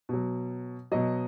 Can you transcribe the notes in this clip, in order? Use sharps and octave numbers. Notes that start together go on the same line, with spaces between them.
B2 F#3
B2 F#3 D#5